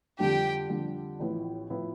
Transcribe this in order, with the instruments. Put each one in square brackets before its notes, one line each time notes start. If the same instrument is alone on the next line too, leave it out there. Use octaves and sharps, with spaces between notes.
[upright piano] F2 D3 G3 D4 [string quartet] G4 G5
[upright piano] F2 D3 G3 D4
A1 A2 F3 B3 E4
A2 F3 B3 E4